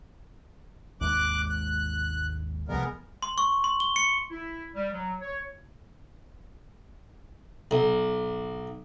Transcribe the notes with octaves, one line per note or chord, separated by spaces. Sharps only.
G#1 D#2 G#3 D6 F#6
F#6
C2 F3 G3 G#3 B3 A#4
C6
C#6
C6
G7
C#7
E4
G3
F#3
C#5
B1